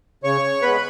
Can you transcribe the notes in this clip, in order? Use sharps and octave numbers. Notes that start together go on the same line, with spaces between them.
C#3 C#5 C#6
G#3 B3 B4 B5